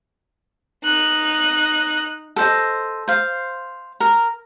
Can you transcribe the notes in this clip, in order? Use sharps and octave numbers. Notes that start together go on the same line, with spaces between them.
D#4 F#6
A4 C5 D#5
C5 F5
A#4